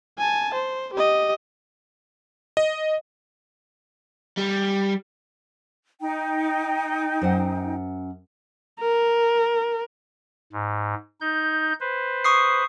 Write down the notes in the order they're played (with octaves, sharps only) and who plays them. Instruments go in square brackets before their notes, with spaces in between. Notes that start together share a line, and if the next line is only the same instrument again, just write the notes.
[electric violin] G#5 A5
C5
G4 D#5
[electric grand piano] D#5
[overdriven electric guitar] G3
[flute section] D#4 G5
[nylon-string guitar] F#2 C5 F#5
[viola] A#4
[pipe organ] G#2
D#4 G6
B4 C5
[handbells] C#6 D#6 C7